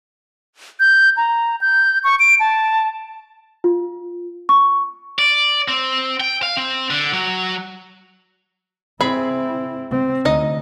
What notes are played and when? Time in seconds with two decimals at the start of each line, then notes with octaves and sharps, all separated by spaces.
0.80 G6
1.17 A#5
1.61 G6
2.04 C#6
2.20 D7
2.40 A5
3.64 F4
4.49 C#6
5.19 D5
5.68 C4
6.20 G5
6.43 F5
6.57 C4
6.90 D3
7.13 F#3
9.01 C4 E4 G#4 B5
9.91 C4
10.25 D2 D#4 D#5